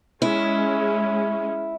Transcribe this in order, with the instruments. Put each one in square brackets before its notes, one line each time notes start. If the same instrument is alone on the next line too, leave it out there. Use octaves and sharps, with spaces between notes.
[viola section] G#3 C#4 [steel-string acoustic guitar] E4